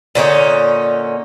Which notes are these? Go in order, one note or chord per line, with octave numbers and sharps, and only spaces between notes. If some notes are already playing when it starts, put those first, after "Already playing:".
A#2 D3 C#4 D#4